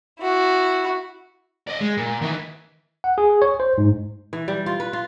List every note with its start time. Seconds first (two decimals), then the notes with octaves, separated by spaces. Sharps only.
0.20 E4 F#4
1.67 D5 D#5
1.81 G#3
1.97 A#2
2.22 D#3 E3
3.04 F#5
3.18 G#4
3.42 C#5
3.60 C5
3.78 G#2
4.33 E3
4.48 G3
4.66 F4
4.80 B4
4.93 F4